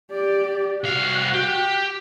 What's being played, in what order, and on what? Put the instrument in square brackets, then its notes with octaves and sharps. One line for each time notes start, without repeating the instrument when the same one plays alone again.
[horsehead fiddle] G4 D5
[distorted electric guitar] C2 F5 [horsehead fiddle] F#4 F#5
[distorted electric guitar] G4